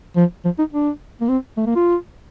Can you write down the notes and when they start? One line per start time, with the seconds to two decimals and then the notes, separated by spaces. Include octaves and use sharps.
0.16 F3
0.45 F3
0.58 D#4
0.73 D4
1.21 A#3
1.29 C4
1.57 A3
1.66 A#3
1.76 F4